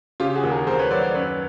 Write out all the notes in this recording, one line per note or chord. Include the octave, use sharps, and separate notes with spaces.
C#3 F4 G4
F#4 G#4
D#2
G#4 A#4
D#2 A#4 C5
B4 C#5
F#3 C5 D5
D5
F#2 B4 C#5